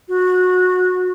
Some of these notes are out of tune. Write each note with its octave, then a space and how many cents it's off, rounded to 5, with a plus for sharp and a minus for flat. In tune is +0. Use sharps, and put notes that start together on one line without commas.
F#4 -20